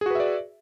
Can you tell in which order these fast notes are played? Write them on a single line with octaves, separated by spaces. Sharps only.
G#4 F#4 B4 E5 D5